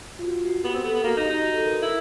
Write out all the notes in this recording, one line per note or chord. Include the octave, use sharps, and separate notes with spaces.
F4
F#4
F#4
B3 G4
C4
B3 A4
B3
A#3 F#4
D#4
G4
D#4
F#4
A4
A#4
B4
E4 A#4